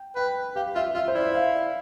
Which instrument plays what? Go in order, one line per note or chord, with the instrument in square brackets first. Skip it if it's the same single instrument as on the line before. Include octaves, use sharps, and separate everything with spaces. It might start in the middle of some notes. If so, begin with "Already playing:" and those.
Already playing: [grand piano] G5
[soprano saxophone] B4 [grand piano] G5
[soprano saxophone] G4 [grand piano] F5
[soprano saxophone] F4 [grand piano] E5
[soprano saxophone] F4 [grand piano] E5
[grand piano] C5
[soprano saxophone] E4 [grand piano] D5
[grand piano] F5